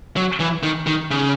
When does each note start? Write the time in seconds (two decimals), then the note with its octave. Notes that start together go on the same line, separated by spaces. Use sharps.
0.17 F#3
0.40 E3
0.63 D#3
0.87 D#3
1.11 C#3